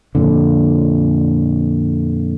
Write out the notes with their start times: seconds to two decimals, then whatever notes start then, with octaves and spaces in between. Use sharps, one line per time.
0.15 F2 A#2 D3